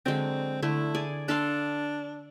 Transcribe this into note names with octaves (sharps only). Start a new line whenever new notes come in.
D3 F#3 G#3 C4
D3 A3 E4
G#4 D5 G#5
D4 A4 F5 C6